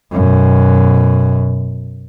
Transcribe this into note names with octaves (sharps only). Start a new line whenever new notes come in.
F#2 B2